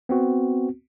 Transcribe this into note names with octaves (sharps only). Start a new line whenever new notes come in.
B3 C4 F#4